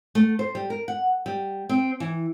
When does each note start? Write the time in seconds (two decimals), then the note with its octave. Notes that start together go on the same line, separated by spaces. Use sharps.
0.15 A3
0.39 C5
0.55 G3
0.70 A#4
0.88 F#5
1.26 G3
1.69 C4
2.00 E3